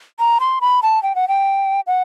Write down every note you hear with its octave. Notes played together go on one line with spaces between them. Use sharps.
A#5
C6
B5
A5
G5
F#5
G5
F#5